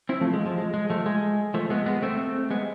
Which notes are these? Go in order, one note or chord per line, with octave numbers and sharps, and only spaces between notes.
C4 E4
F3 A3
G#3
F3
G#3
G#3
F3 A3
G#3
F3 A3
G#3 B3
G#3 B3
A3 C4
G#3 B3